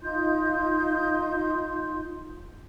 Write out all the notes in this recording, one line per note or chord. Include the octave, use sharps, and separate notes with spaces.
D#4 F4 C6 G6